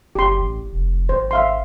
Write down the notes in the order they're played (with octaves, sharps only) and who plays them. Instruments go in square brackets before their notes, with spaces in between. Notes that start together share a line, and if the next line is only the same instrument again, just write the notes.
[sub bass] F#1 [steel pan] G4 C6
[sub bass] A1
F1
[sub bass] G#1 [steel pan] C5
[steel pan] E5 F5 C6